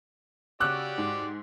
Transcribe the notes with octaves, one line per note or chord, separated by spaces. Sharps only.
C#3 F#4 G4 D5 C#6 D6 E6 F#6
G#2